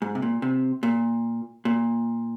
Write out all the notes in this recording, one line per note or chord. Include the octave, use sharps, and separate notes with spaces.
G#2
C3
A#2
C3
A#2
A#2